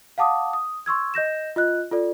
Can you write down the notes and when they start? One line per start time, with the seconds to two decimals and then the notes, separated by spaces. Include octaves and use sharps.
0.18 F5 F#5 A5 D6 D#6
0.53 D#6
0.86 C6 C#6 E6 G#6
1.14 D#5 G6 A#6 E7
1.56 F4 D#5 F#6
1.91 F4 A4 D5